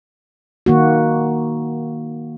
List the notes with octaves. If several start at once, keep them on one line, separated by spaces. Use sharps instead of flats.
D#3 A#3 F#4